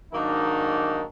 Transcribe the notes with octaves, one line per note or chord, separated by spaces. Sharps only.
G#2 D#3 F#3 A#3 D4 D#4